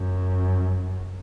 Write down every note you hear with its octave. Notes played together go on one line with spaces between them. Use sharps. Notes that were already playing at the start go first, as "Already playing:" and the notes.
Already playing: F#2